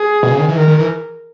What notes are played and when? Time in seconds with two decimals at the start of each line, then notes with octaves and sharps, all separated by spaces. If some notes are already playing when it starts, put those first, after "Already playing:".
Already playing: G#4
0.23 B2
0.31 C#3
0.39 D#3
0.48 E3
0.57 D#3 A#4
0.68 D#3
0.79 E3